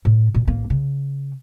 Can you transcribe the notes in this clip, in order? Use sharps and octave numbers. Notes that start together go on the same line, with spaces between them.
A2
A#2
A1 A#3
C#3